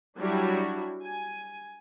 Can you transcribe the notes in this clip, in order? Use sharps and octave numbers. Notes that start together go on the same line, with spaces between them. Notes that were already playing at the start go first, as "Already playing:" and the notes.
F#3 G3 D4 E4 F#4 G4
G#5